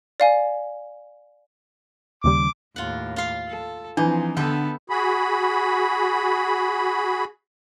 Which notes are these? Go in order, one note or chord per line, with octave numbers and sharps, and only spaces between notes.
D5 F5 G#5
D#2 C#3 G3 D6
D#2 A2 F4 F#5
F4 F5
A4
E3 F3 C4 D4 D#4
D3 B3 A4 B4 E5 G5
F#4 G#4 B5